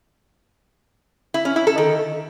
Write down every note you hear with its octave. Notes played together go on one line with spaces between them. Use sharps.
E4
C#4
E4
A4
D#3